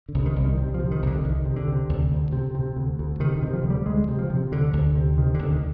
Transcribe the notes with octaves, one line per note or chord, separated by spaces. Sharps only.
D3
C2
D#3
C2
D#3
C3
F3
C3
D#3
C2 D3
C2 D#3
C3
D3
C3
D2
D2
C3
C3
D2
D2
C3 D#3
D#3
C3
F3
D2
G3
D2 G#3
C3
F3
C3
D2 D3
D2
C3
C3 D#3
D3
D2
D#3